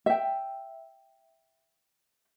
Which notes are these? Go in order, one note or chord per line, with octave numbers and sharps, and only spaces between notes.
E5 G5